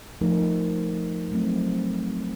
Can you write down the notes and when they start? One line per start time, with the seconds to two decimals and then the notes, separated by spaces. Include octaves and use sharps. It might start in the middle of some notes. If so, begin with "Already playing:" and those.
0.21 F3 A3 D#4 A#4
1.32 F#3 A3 C4